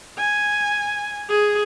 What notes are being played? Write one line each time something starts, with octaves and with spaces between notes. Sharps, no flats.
G#5
G#4